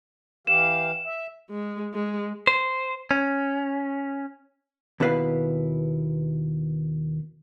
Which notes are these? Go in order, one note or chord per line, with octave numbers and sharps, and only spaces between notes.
E3 G4 F5 E7
E5
G#3
G#3
C5
C#4
D#2 B2 E4 B4 F5